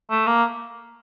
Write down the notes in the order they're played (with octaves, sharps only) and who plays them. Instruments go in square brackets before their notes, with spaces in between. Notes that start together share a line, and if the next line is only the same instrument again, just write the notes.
[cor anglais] A3
A#3